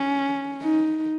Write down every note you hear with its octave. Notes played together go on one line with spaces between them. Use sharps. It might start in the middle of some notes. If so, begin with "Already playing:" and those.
Already playing: C#4
D#4